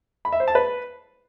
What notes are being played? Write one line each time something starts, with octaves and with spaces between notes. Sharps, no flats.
B5
E5
C5
A5
B4